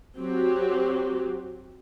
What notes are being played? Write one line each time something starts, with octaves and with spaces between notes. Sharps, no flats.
F#3 C4 F#4 G4